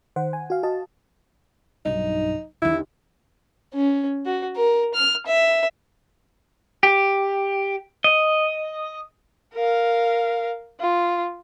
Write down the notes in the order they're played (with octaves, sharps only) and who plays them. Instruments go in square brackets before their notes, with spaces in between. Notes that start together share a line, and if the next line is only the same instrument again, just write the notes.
[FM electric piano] D#3 C5 F#5
G#5
F#4 F5
F#4 D#5 A5
[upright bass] B1 G2 [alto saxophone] D#4
[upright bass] D#2 D3 [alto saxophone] E4
[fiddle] C#4
F#4
A#4
F6
E5
[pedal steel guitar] G4
D#5
[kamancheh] A#4 F5
F4